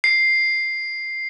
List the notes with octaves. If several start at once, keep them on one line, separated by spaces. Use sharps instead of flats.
C7